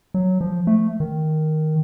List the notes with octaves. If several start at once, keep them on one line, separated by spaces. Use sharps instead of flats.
F#3
F3
A3
D#3